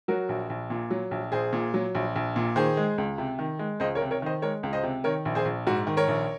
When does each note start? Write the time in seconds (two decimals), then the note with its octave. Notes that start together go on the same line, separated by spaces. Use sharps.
0.08 F#3 F#4 A#4
0.29 A#1
0.50 A#1
0.70 A#2
0.91 F#3
1.11 A#1
1.32 A#1 G#4 C5
1.53 A#2
1.74 F#3
1.95 A#1
2.16 A#1
2.36 A#2
2.56 D#3 G#4 C5
2.77 G#3
2.98 C#2
3.18 C3
3.39 D#3
3.59 G#3
3.80 C#2 C5 D#5
3.95 A#4 C#5
4.01 C3
4.11 A#4 C#5
4.22 D#3 C5 D#5
4.42 G#3 A#4 C#5
4.63 C#2
4.73 C5 D#5
4.83 C3
5.04 D#3 A#4 C#5
5.25 A#1
5.35 G#4 C5
5.45 A#1
5.67 G#2 F#4
5.87 D#3
5.97 A#4 C#5
6.08 A#1